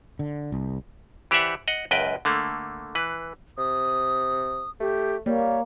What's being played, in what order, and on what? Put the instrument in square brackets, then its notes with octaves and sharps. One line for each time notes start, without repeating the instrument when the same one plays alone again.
[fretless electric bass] D3
C2
[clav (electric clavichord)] E3 G4 C5 D5 E5 F#5
D#5 F#5
C#2 F#2 B4 D#5 G5
D3 A3 A#3
E3 B4
[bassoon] C3 [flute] D#6
[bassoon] A3 [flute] G4
[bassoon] G3 [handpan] A#3 [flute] C#5